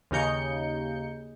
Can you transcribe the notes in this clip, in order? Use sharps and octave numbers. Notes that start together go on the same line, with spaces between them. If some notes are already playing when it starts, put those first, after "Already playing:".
D#2 C#3 D#4 G6 C#7